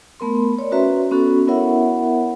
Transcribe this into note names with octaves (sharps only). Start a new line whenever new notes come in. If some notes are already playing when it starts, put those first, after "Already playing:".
A3 B3 A#4 C6
C#5 D5
C#4 F#4 B4 E5 A#5 C6
B3 C#4 F#4 A4
B3 E4 A#4 C#5 E5 F#5